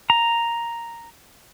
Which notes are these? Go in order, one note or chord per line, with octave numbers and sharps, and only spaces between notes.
A#5